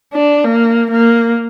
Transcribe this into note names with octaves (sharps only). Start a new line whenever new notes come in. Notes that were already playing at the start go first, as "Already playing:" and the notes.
D4
A#3
A#3